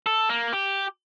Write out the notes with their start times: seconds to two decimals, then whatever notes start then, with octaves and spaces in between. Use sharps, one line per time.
0.06 A4
0.29 A#3
0.53 G4